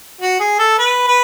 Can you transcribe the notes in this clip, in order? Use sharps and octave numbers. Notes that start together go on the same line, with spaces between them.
F#4
G#4
A4
B4
B4